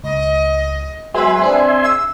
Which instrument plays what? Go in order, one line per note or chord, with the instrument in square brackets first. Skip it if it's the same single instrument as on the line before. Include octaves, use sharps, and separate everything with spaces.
[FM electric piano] C#2 [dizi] D#5
[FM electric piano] F#3 G#3 B3 [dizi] B4 [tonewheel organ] E5 G#5 C6
[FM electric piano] C4 D4 G#4
[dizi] E6